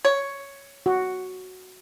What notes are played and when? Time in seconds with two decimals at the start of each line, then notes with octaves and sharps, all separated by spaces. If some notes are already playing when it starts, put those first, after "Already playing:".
0.05 C#5
0.86 F#4